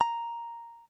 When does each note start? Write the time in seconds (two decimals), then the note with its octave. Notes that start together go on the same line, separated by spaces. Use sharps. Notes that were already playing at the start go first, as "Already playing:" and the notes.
0.01 A#5